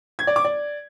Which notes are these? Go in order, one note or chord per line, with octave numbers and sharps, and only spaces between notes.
G#6
D5
D6
D5